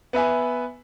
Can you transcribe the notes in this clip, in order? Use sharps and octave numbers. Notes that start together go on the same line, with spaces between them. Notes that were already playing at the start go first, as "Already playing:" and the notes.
B3 B4 E5 G#5